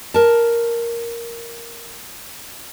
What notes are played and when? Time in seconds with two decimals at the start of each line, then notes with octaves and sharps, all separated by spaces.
0.14 A#4 A5